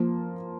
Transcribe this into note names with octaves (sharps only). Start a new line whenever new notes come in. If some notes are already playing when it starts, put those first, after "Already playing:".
Already playing: F3 A#3 F4